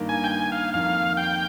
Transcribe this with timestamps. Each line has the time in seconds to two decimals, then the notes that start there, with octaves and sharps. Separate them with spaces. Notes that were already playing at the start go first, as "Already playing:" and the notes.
Already playing: G2 D#3 A#3
0.09 G#5
0.24 G5
0.31 G#5
0.52 F5
0.73 F2 D#3 A#3 F5
1.17 G5